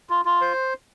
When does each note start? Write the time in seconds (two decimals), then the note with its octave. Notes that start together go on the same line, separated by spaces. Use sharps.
0.10 F4
0.25 F4
0.41 C5